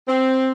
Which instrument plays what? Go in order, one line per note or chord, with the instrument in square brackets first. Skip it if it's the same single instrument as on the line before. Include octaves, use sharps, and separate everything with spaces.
[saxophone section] C4